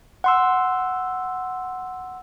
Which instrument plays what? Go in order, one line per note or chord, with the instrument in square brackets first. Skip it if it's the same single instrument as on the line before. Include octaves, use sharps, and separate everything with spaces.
[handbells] F#5 C6 E6